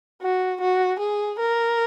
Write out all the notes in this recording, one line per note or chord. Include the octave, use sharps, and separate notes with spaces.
F#4
F#4
G#4
A#4